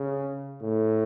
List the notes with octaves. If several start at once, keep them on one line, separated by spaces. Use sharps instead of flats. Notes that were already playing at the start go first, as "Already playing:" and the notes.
Already playing: C#3
A2